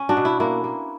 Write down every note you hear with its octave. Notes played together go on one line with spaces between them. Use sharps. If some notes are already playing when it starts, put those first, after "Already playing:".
Already playing: C#4
D4 F#4
B2
E4
A#3 E4
A#3